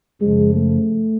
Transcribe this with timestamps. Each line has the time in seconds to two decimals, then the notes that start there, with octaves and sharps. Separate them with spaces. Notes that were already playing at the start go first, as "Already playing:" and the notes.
0.21 F#2 C#3 F3 G#3
0.55 A3